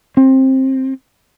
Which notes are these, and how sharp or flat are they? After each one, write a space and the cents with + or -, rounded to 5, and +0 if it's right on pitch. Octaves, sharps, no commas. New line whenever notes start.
C4 +20